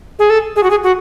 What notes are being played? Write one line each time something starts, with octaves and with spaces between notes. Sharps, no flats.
G#4
A4
G#4
F#4
G#4
F#4